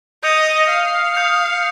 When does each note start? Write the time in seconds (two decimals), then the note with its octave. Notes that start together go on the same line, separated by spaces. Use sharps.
0.23 D#5 D#6 G6 C#7 F7
0.70 F5
1.15 D#6 G6 C#7 F7